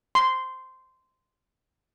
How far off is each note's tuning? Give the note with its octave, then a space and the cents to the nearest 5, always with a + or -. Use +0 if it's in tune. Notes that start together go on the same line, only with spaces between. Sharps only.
C6 -10